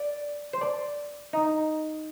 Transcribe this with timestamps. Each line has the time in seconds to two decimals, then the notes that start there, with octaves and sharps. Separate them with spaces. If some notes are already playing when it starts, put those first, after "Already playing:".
Already playing: D5
0.53 C5
0.61 D5
1.33 D#4